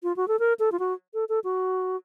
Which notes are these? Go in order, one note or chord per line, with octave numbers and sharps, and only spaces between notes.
F4
F#4
A4
A#4
A4
F4
F#4
A4
A4
F#4